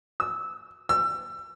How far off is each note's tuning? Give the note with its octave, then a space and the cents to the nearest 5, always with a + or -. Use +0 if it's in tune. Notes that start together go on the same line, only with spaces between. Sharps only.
E6 -20
E6 +30